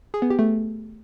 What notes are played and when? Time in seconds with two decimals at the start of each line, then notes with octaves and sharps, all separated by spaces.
0.14 G#4
0.22 B3
0.30 G4
0.39 A3